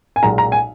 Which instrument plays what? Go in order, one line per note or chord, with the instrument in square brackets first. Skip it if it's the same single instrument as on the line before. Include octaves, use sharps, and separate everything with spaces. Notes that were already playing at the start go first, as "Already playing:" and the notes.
[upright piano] G#5
B1 A#2 G#3 A#5
A#5
G#5